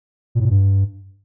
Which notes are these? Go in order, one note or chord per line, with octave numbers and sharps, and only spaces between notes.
A#2
A2
A#2
G2